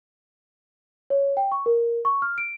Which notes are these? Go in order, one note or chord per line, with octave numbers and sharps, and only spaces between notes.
C#5
G5
C#6
A#4
C#6
F6
D7